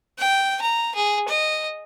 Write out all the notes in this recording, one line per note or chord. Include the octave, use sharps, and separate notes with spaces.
G5
A#5
G#4
D#5